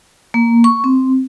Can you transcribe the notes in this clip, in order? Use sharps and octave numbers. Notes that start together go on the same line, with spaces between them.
A#3
C#6
C4